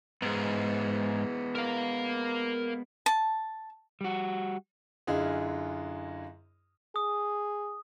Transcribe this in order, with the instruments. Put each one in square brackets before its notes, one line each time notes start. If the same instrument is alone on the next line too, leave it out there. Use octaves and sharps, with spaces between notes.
[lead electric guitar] G#2 [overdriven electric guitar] G#3 B3
[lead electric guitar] A#4 F5
[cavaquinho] A5
[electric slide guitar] G3 F#4
[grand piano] F#2 D3 E4 F4 G#4 D#5
[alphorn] G#4 [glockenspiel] D#6